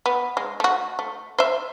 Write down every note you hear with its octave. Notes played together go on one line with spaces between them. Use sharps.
B3
G#3
A3 F#4
A3
C5 E5